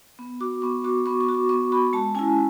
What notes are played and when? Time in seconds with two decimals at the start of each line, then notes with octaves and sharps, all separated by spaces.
0.19 B3
0.40 F#4 D6
0.62 B3 C#6
0.84 F#4 D6
1.06 B3 C#6
1.21 C#6
1.29 F#4
1.35 D6
1.49 B3 C#6
1.72 F#4 B5
1.93 G#3 A5
2.15 C#4 E4 G#5